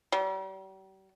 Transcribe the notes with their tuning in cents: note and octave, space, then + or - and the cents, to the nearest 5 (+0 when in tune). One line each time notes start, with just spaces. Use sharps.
G3 -40